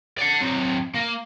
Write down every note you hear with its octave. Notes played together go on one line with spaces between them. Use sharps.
D5 F#5
F#3 C4
A#3